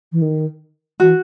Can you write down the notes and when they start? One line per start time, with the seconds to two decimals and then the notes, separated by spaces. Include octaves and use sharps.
0.12 E3
0.22 D#3
1.00 E3 F#4